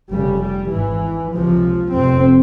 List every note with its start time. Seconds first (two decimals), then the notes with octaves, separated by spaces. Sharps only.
0.10 F1 F2 C#3 G3
0.41 G3
0.71 G#1 G#2 E3
1.33 C#2 C3 F3
1.94 F1 F2 C3 C4